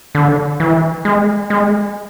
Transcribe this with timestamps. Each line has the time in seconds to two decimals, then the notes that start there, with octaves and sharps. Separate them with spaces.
0.15 D3
0.60 E3
1.05 G#3
1.50 G#3